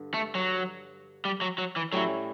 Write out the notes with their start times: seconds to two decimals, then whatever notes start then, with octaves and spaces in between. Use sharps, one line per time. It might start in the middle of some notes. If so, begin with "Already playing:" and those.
Already playing: G2 D3
0.14 A3
0.35 F#3
1.25 G3
1.41 F#3
1.58 F#3
1.76 E3
1.92 A2 F#3 G3 C#4 E4